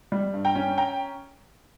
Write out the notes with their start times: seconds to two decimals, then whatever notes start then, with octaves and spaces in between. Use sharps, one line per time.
0.12 G3
0.33 G2
0.45 G5 A#5
0.55 C#4
0.78 G5 A#5